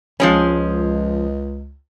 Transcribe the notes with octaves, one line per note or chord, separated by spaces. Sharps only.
C#2 F3 G#3 C#4